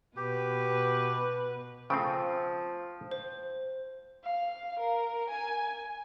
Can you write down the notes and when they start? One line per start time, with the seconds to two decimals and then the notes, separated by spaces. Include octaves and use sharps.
0.17 B2 G4 B4
1.90 C#3 F3 A3 C4 G5
3.11 C5
4.24 F5
4.80 A#4
5.30 G#5